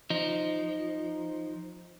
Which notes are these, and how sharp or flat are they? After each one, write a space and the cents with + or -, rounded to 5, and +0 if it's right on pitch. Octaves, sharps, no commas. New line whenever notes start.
F3 +0 D#4 +0